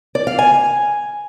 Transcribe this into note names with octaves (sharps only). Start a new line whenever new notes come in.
D5
F5
G#5